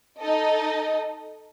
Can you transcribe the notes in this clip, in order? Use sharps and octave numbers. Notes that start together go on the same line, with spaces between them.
D#4 A4 D#5